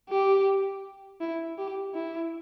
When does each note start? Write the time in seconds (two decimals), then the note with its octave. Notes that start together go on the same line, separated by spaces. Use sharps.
0.09 G4
1.21 E4
1.58 G4
1.94 E4